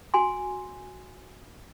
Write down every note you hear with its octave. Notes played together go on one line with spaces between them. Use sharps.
F#4 G#5 C6